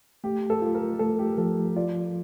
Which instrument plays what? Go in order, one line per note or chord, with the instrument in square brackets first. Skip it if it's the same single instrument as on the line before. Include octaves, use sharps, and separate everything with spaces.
[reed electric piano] A3 [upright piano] G4
[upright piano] A4
[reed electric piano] F4
[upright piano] A#4
[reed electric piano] A3 [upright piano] A4
[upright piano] G4
[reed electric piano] F3 [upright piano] A4
[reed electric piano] F4 [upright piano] D5